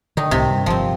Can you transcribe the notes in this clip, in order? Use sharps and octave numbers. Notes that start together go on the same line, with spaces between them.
D3 D#3 D#4
C2 A2 C3
G2
G1 F3 C4